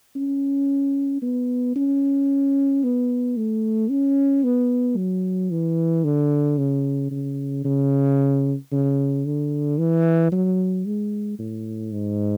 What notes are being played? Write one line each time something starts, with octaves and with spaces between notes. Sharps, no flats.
C#4
B3
C#4
B3
A3
C#4
B3
F#3
E3
D3
C#3
C#3
C#3
C#3
D3
E3
F#3
G#3
A2
G#2